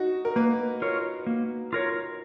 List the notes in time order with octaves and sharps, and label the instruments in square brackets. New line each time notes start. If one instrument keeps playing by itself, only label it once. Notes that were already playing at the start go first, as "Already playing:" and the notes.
Already playing: [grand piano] D#4 F#4
A#4
[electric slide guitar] A#3 [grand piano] B4
[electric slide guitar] F4 A#4 C#5
A#3
F4 A#4 C#5